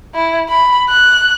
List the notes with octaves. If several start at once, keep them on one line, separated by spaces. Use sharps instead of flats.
E4
B5
F#6